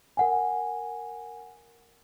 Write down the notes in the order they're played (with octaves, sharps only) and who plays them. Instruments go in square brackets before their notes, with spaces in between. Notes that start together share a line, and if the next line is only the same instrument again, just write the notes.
[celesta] A#4 F#5 G#5